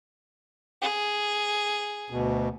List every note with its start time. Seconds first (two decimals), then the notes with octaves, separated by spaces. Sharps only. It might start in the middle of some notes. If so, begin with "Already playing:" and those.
0.81 G#4
2.10 D2 B2